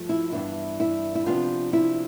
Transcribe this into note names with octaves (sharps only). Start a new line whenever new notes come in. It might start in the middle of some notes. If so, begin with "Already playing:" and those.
Already playing: G2 F3 A3
E4
G2 E3 B3 D4 E4
E4
E4
C3 F3 B3 D4 F4
E4